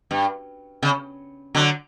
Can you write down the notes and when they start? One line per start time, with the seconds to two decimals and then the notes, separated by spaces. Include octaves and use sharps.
0.11 G2
0.83 C#3
1.55 D3 F#3